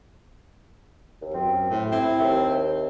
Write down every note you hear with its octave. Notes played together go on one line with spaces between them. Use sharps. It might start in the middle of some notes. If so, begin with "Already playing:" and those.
D#2
F#2 C4
A2
C4 E4
D#2